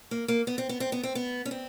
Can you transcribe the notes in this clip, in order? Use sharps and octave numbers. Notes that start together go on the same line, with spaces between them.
A#3
A#3
B3
C4
B3
C4
B3
C4
B3
C#4
C4